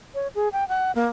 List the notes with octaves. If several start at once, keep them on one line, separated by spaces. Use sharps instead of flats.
C#5
G#4
G5
F#5
A#3